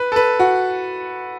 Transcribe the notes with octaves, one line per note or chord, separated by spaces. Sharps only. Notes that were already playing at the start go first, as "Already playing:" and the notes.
Already playing: B4
A4
B4
F#4